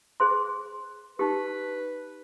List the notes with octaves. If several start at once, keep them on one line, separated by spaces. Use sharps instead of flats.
G#4 C5 C6
D#4 G4 B4